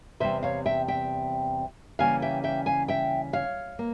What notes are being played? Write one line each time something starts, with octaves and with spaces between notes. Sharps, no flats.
E2 C3 G3 C4 C5 E5
C#5 F5
E5 G5
E5 G5
C#3 E3 G3 A#3 C#4 F5 G#5
E5 G5
E5 G5
F5 G#5
E5 G5
C#5 F5
A#3